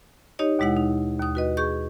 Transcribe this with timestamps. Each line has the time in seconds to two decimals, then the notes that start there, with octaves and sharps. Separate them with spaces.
0.39 D#4 G4 C#5 D#5
0.59 D#2 B2 G#3 E4 F#5
0.77 D#4
1.19 D#2 D#6
1.35 F#4 B4 D#5
1.57 G#4 C#6 G6